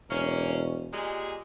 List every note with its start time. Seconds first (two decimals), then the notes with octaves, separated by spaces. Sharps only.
0.10 E1 A#3 C#4
0.92 A#2 G3 G#3